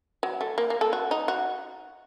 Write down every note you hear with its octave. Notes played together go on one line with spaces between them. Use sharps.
F#3
A3
A#3
A#3
A4
F#4
D#4
F#4